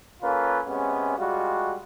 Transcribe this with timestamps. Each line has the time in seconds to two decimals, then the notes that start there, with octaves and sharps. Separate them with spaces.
0.22 A#3 C#4 F4 A4 B4
0.67 C3 G#3 B3 C#4
1.18 G3 G#3 F4 F#4